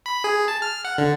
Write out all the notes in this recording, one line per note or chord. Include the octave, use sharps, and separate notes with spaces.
B5
G#4
A5
F6
F#5
D3